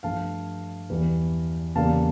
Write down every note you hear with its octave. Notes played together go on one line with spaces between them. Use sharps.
G2 F3 A3 F5 A5
E2 E3 G3
E2 C#3 G3 A#3 F5 A5